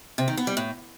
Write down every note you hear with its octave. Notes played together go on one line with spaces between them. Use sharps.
C3
D#3
B3
G3
A2